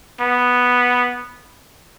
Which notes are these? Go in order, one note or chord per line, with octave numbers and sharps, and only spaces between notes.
B3